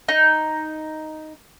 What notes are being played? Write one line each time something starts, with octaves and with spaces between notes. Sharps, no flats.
D#4